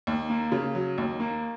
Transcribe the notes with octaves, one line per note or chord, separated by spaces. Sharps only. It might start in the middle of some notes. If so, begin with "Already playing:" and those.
D#2
A#3
C#3
F#3
D#2
A#3